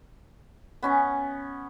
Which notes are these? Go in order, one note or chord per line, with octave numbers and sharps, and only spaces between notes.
B3 C#4 C#6